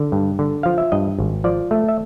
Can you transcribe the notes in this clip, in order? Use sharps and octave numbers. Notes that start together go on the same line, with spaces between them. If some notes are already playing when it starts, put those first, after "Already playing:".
Already playing: D3
G2
D3
F3 F5
E5
G2 D#5
G#1
F3 D5
A3
E5